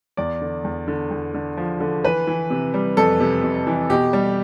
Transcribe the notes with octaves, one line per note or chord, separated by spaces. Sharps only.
E2 D5
D3
E2
D3
E2
D3
F3
D3
E3 B4
E3
C3
G3
F2 A4
C3
C3
E3
B2 G4
G3